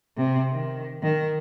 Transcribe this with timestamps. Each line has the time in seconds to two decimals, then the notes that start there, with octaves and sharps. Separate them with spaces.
0.17 C3
0.52 D#3
1.02 D#3